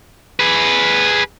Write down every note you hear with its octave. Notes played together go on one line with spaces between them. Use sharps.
G#4 B4